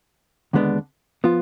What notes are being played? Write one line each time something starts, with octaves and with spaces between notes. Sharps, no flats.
D#2 D3 G#3 B3 D4
F3 B3 F4